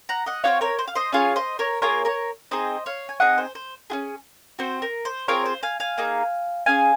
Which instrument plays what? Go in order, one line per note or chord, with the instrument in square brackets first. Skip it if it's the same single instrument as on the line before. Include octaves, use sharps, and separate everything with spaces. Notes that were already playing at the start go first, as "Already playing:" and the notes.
[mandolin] F#5 A#5
D#5 F#5
C4 D#4 F#4 C#5 F5
A#4 C#5
C5
F5
C5 D#5
C#4 F4 G#4 C#5 F5
C5 D#5
A#4 C#5
A#3 F4 G#4 A#4 C#5
A#4 C#5
C4 D#4 G#4 C5 D#5
C#5 F5
G#5
C4 D#4 G#4 D#5 F#5
C5
C5
C#4 F4 G#4
C4 F#4 C5
A#4
C5
C4 F4 G#4 A#4 C#5
C5
F5 G#5
F5 G#5
A#3 D#4 G#4
C#4 G#4 F5 G#5